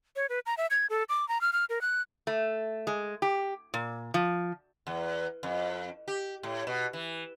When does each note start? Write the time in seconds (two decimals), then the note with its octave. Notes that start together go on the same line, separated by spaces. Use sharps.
0.16 C#5
0.29 B4
0.46 A#5
0.58 E5
0.71 G#6
0.90 A4
1.09 D6
1.29 A#5
1.41 F6
1.53 F6
1.70 A#4
1.81 F#6
2.27 A3
2.87 G#3
3.22 G4
3.74 A#2
4.14 F3
4.87 E2
5.43 F2
6.08 G4
6.43 A2
6.67 B2
6.93 E3